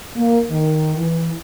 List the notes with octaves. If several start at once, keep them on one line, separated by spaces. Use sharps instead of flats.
A#3
D#3
E3